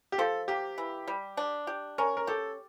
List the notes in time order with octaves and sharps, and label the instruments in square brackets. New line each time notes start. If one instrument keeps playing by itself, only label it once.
[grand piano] G4
[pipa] F3 [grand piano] A4
[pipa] A#3 [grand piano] G4
[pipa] E3
G3
D4
G4
[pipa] C#4 [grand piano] A#4
[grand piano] A#4
[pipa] G4 [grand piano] A4